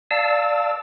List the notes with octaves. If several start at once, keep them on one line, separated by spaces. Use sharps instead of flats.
D5 F5 A5 E6